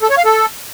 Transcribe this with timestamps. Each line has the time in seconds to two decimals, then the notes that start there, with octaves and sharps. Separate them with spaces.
0.03 A4
0.10 C#5
0.18 F5
0.25 A4